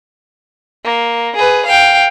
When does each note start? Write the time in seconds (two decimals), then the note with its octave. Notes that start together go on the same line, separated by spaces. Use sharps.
0.84 A#3
1.35 G#4 B4
1.65 F5 G5